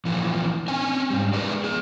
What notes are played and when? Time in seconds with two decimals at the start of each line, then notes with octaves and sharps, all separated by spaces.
0.05 A#2 E3 F3
0.68 C4 C#4 G#5
1.10 G#2 G3
1.33 G#3 G#4 A#4 B4 D5
1.64 G#4 D5